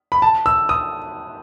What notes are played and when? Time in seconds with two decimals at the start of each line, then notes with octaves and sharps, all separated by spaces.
0.12 B5
0.22 A5
0.46 E6
0.69 D#6